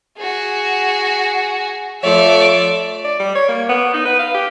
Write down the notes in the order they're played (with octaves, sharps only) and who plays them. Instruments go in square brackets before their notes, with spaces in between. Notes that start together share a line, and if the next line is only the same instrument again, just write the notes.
[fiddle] F#4 G#4
[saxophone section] F3 A3 C#5 [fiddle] D5 E5
[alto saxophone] D5
G3
C#5
A#3
B3
D#4
B4
F5
G4